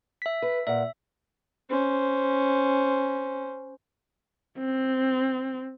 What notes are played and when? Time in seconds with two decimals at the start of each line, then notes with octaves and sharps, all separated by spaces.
0.22 E5 B6
0.42 B4
0.67 A#2 E5 F#5
1.70 C#4 C5
4.59 C4